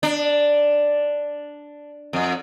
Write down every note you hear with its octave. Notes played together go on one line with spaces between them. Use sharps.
D4
F2